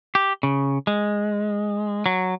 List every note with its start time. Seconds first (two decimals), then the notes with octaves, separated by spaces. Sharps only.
0.15 G4
0.43 C#3
0.87 G#3
2.06 F#3